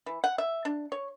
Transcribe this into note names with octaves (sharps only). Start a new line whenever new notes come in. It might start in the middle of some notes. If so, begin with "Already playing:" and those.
E3
F#5
E5
D4
C#5